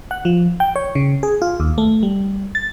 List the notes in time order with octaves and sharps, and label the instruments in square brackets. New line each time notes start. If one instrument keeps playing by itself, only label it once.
[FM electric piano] F#5
F3
G5
C#5
C#3
G#4
F4
D#2
A3
G3
A6